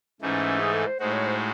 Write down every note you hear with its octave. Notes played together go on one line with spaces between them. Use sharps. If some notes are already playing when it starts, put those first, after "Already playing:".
G#2 E3 A3 C#4 D#4
G#4
A4
C5
A2 G#3 D#4 F#4 C5
C#5
C5